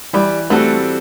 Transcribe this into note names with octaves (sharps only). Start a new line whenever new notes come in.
E3 G3
G3 A3 C4 F#4 A4